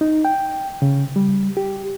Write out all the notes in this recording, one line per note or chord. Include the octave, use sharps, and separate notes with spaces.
D#4
G5
C#3
G3
G4